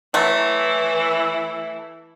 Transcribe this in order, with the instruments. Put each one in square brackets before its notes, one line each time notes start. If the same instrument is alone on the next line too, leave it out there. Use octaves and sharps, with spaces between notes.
[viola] E3 E4 [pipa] F#3 A3